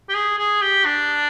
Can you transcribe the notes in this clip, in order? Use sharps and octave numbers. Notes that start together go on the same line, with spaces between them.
G4
G#4
G#4
G4
D4